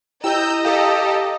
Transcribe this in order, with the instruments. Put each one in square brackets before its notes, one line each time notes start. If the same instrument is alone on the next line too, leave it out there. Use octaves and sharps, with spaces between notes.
[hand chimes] E4 G4 G5 [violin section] D#5 A#5 [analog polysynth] E6 G6
[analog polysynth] G4 A4 [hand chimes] F5 D#6